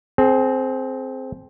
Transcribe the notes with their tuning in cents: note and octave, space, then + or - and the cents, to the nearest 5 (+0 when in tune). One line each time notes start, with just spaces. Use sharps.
C4 +0 G#4 +40